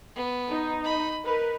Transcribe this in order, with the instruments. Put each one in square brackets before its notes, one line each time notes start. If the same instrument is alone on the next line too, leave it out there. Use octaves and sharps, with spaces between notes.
[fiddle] B3
[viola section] D#4
[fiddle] D#5 B5
[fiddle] D#4 [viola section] A#4 B4